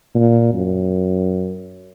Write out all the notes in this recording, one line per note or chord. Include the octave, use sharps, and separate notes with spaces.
A#2
F#2